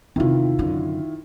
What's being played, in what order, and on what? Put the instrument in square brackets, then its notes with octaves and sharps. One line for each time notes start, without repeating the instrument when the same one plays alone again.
[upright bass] E2 C3 [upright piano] D#3 E4 F4
[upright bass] F#2 D3